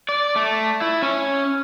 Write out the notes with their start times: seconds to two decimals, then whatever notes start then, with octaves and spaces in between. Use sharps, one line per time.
0.09 D5
0.36 A3
0.81 E4
1.02 C#4